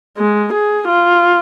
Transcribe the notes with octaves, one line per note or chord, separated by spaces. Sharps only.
G#3
G#4
F4